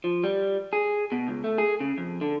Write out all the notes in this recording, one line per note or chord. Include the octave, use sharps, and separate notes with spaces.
F3
G3
G#4
B2
C#2
A3
G#4
C#3
F2
D3